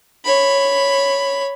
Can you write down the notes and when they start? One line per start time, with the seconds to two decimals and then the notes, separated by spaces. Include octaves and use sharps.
0.25 C#5 B5